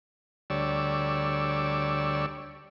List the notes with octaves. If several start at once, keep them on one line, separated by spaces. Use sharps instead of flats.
D2 G3 C#5 D5 E6